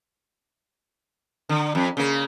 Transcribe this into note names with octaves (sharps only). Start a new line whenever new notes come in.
D3
F2
C#3 A#3